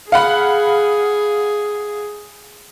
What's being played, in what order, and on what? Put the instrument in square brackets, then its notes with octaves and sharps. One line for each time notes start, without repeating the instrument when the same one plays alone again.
[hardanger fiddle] G#4 [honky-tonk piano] F5 F#5 B5